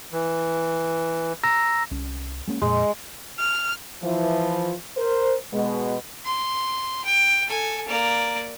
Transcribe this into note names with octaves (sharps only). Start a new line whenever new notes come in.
E3
A#5 E6 A#6
C2 C#4
G#3 A#3 C#4
F2 A#2 G#3
F6
E3 F3
A#4 C5
B2 G#3
C6
G5
A4 G#5
A#3 D5